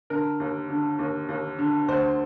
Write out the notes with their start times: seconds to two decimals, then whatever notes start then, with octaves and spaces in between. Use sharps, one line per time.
0.10 D3 A#4
0.40 D#2
0.70 D3
0.99 D#2
1.29 D#2
1.59 D3
1.88 D2 C5